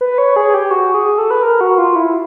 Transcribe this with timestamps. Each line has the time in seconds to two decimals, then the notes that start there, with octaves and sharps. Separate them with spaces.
0.01 B4
0.18 C#5
0.36 G#4
0.54 G4
0.71 F#4
0.94 G#4
1.18 A4
1.31 B4
1.43 A#4
1.61 F#4
1.78 F4
1.96 E4